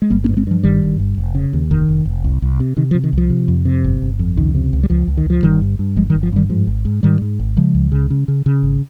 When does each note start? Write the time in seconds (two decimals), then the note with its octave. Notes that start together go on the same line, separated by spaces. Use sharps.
0.02 G#3
0.10 G1 G3 A#3
0.24 A#3 C#4
0.29 G2
0.37 G#3 C4
0.47 G2 F3
0.63 G1 D#3 G3
0.82 G2
0.99 G1
1.18 F1
1.35 C#3
1.53 D#2
1.70 F1 D#3
1.89 F1
2.06 F1
2.24 C2
2.42 C2
2.60 C3
2.77 C3 D#3
2.91 F3
2.95 C3
3.04 D#3
3.13 C2 F3
3.30 C3
3.48 F2
3.65 C3
3.84 G1
4.02 G1
4.19 F2
4.37 C#2 D#3
4.55 C3
4.73 C#2
4.83 G3
4.90 C#2 F3
5.07 C#2
5.17 D#3
5.26 C#2 F3
5.43 G1 D#3 G3
5.61 G2
5.79 G2
5.96 G1 F3 G#3
6.10 D#3 G3
6.15 G1
6.23 F3
6.33 G2 D#3 G3
6.50 G#2 F3
6.67 G#1
6.85 G#2
7.03 G#2 D#3 G3
7.22 G#2
7.39 G#1
7.57 C#3 F3 G#3
7.75 C#2
7.92 C#3
8.10 C#3
8.28 C#3
8.46 C#3
8.63 G#1